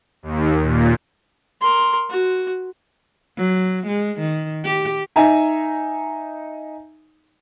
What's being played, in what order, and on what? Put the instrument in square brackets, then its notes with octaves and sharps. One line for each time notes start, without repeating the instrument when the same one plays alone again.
[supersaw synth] D#2
A#2
[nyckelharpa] A#4 C6
F#4
[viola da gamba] F#3
G#3
D#3
G4
[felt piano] D#4 E5 G#5 A#5